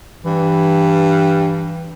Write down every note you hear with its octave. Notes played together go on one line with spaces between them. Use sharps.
G2 E3